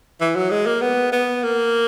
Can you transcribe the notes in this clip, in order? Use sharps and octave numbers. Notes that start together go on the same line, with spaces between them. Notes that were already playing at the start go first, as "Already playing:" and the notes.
E3
F#3
G#3
A#3
B3
B3
A#3